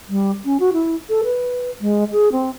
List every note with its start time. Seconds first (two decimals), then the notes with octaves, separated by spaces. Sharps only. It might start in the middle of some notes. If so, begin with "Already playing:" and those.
0.09 G3
0.45 C#4
0.60 F#4
0.73 E4
1.10 A4
1.24 B4
1.81 G#3
2.12 G#4
2.32 C4